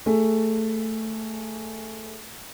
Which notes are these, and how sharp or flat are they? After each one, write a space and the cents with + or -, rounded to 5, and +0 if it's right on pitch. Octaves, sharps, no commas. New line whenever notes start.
A3 +10 G#4 +0